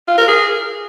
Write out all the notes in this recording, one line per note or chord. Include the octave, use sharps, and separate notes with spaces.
F4
A#4
G#4